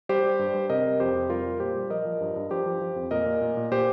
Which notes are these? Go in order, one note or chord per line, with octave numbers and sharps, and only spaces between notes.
G3 G4 C5
G3
G2
G3
C3 A#4 D#5
G3
F2 G4 C5
F2
G3 F4 A#4
G3
A#2 G4 C5
G3
F3 A#4 D#5
F3
G2
G2
F3 G4 C5
F3
F3
F2
A#2 A#4 D#5
A#2
A#2
A#2
A#2 G4 C5